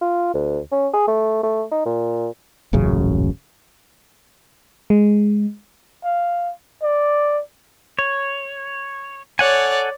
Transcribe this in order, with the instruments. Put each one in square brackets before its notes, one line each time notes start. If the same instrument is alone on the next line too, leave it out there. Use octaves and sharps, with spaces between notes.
[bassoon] F4
D2
C#4
G#4
A3
A3
D#4
A#2
[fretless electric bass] D#1 A1 F#2 C#3
[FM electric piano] G#3
[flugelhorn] F5
D5
[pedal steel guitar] C#5
[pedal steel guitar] A4 F#5 G#5 [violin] C#5 D5